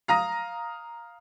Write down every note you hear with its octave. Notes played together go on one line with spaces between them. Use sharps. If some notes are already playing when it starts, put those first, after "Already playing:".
F5 A#5 D#6 A#6